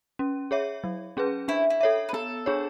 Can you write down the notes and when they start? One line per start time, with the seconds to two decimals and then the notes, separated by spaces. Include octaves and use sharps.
0.19 C#4
0.51 G#4 C#5 E5
0.84 F#3
1.17 C#4 G#4 B4
1.48 D4 E4
1.70 E4
1.81 A4 C#5 E5
2.09 B4
2.13 B3 A4
2.46 D4 G#4 C#5